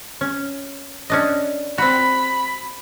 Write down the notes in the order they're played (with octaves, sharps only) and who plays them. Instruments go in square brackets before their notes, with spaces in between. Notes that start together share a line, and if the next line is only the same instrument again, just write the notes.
[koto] C#4
C#4 D4 D#5
[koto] C4 F#4 [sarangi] B5